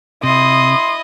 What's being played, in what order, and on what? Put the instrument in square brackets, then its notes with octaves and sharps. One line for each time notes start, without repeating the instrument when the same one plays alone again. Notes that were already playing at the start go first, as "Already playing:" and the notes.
[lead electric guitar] C3 [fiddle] E4 D#5 [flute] C6 [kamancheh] D#6